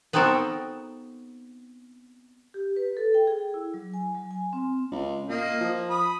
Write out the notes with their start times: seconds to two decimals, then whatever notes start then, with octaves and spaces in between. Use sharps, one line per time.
0.13 B3 C4 D#4 F#4 A4 A#4
2.54 G4
2.76 B4
2.97 A4
3.14 G5
3.27 G#4
3.54 E4
3.74 F#3
3.94 G#5
4.15 F#3
4.31 G#5
4.53 C4
4.92 C#2
5.29 A#2 A#3 D#5
5.61 F3
5.90 B5 D#6